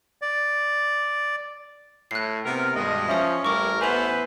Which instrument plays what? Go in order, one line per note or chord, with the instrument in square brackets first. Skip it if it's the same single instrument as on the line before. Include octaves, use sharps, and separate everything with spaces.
[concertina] D5
[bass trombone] A2 [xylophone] F#6 C7
[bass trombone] C3 [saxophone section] B3 A#4
[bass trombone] G2 [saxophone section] B2 D#3 G#3 [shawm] D#5
[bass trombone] F3 [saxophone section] C#4 [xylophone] E5 D#6
[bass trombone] A1 [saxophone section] G3 A#3 E4 [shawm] A#4 [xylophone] C#6 D6
[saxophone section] B3 E4 B4 [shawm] C5 [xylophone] G#5 F#6 F7